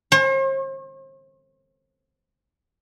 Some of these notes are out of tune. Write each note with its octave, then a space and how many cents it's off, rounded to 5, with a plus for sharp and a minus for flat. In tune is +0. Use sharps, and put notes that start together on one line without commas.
C5 +45